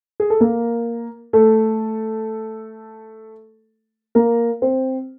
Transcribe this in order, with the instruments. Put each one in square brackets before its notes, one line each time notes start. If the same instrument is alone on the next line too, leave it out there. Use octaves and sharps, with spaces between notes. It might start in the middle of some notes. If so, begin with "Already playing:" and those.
[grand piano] G#4
A4
A#3 A#4
A3 A4
A#3 A#4
C4 C5